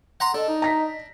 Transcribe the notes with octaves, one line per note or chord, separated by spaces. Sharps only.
F#5 A#5 C6
D4 A4 D#5
D#4
A#5 A#6 B6